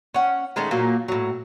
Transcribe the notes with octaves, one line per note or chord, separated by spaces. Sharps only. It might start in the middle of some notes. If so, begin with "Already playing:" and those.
C#4 F#5
D#3 G#3 A3 C#4
A#2 F#3 A#3
A2 F#3